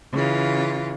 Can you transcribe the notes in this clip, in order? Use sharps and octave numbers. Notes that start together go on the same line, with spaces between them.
C#3 E3 F4